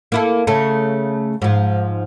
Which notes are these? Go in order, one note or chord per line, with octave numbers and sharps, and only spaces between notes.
A#3 E4 A4
C#3 A3 A4
G#2 F3